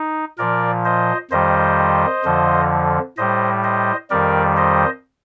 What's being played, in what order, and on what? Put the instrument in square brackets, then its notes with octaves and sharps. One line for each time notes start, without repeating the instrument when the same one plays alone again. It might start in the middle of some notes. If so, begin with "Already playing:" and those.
Already playing: [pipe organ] D#4
A#2 F3 A#4 D5
C5 D#5
F2 D#3 G3 C5 D#5
F2 D3 F3
A2 G3 C5 D#5
C5 D#5
F2 D#3 G3 A#4 D5
C5 D#5